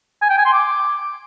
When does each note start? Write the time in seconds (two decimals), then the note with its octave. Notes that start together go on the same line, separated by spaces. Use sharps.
0.22 G#5
0.30 G5
0.37 G#5
0.45 C6
0.53 D6